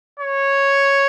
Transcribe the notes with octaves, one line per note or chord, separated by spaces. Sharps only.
C#5